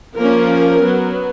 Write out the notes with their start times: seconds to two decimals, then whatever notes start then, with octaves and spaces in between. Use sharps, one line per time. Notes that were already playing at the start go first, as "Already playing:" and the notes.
0.17 F3 A#3 C#4 A#4
0.80 F#3 B3